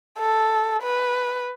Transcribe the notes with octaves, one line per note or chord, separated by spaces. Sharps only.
A4
B4